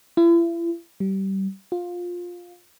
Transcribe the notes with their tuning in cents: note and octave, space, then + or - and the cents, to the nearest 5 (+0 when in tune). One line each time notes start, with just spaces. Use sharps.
E4 +40
G3 -25
F4 +15